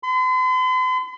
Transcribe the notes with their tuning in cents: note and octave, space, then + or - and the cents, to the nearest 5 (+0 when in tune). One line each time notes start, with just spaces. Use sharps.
C6 -45